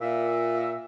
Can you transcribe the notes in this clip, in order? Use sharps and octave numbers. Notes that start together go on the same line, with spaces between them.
A#2 E5